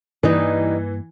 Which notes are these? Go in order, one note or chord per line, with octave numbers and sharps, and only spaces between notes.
G2 E3 G3 A#3 D#4 B4 D#5